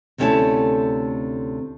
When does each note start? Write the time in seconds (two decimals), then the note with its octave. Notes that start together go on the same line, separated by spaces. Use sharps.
0.18 D2 C3 A3 C#4 E4 A5